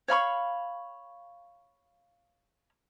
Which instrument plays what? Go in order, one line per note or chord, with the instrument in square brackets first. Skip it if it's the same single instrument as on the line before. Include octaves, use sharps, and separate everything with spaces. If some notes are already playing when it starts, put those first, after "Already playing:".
[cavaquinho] C#5 F5 B5 C#6